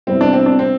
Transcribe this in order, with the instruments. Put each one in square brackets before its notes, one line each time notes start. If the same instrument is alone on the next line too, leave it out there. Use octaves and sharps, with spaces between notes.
[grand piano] C3 G3 B3 E4 [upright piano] C4
[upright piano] D4
C4
D4
C4